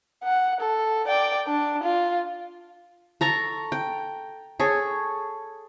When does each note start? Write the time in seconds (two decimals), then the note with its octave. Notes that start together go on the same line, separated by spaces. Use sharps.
0.24 F#5
0.60 A4
1.07 D5 G5
1.47 D4
1.83 F4
3.21 A4 A#5 C#6
3.72 G5
4.60 G#4 A4 C#5